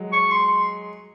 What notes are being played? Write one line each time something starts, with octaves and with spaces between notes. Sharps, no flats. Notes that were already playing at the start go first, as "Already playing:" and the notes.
Already playing: F#3 G#3
C#6
C6